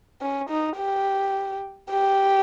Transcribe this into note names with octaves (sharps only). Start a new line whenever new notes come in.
C#4
D#4
G4
G4